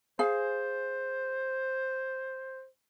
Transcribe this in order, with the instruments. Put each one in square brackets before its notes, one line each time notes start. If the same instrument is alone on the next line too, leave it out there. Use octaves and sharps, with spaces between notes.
[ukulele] G#4 F5 [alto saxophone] C5